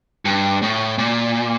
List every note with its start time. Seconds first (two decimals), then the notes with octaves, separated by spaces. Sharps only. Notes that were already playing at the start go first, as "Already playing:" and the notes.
0.25 G2
0.62 A2
0.98 A#2